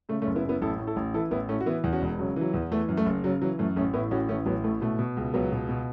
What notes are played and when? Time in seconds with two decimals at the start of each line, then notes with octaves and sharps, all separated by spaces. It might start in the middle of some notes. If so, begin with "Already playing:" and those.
0.09 C#3 A3
0.22 A3 C#4
0.27 F#1
0.35 B3 E4
0.44 F#2
0.49 B3 E4
0.61 A1 E4 A4
0.79 A2
0.87 E4 A4
0.96 A1
1.14 E3 E4 A4
1.31 A1 B3 E4
1.49 A2 A3 C#4
1.61 F#4
1.66 E3 B3 E4
1.84 E2
1.93 C#4 F#4
2.02 E1
2.19 C#3 F#3
2.36 E3 F#3
2.54 E2
2.71 E3 A3
2.89 F#2
2.97 A3
3.06 F#1
3.24 C#3 F#3
3.41 E3 F#3
3.59 F#2 A3
3.76 A1 A3 C#4
3.94 A2 B3 E4
4.11 A1 C#4 F#4
4.29 E3 A3 C#4
4.46 A1 F#3 B3
4.64 A2 A3
4.81 B2 A3
4.99 B2
5.17 C#2
5.34 C#2 F#3 B3
5.52 B2
5.69 B2